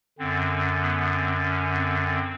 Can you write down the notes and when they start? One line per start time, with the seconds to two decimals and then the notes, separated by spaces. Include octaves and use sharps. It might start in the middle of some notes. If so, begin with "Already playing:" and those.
0.18 F#2 D3 C4
0.81 B3
1.12 C4
1.44 C#4
1.74 C4
2.06 C4